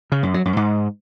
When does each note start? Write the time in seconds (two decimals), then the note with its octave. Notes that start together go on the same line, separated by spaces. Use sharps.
0.12 C#3
0.23 F#2
0.34 F#3
0.45 F#2
0.57 G#2